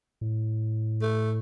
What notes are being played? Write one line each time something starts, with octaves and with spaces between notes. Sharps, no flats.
A2
A3